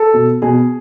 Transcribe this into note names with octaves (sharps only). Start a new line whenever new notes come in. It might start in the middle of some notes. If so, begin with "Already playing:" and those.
Already playing: A4
B2
B2 G#4